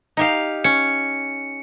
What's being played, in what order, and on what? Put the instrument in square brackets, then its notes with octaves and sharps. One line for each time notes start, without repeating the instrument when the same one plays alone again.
[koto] D#4 G4 F5
[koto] C#4 [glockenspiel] C#7